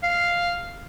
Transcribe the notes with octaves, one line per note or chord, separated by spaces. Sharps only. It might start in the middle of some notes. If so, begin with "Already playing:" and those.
F5